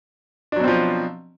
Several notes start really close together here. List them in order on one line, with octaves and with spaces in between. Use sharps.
D4 F#3 B2 C4 F3